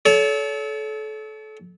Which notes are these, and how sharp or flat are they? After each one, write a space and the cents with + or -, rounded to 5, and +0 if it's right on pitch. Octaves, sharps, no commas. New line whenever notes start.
A4 -30 C#5 +35